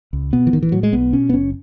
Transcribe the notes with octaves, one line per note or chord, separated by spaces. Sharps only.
C#2
B2 B3
E3
A1 D#3
E3
A2 F#3
G#3
B1 B3
B2 C#4
B3
F#1 C#4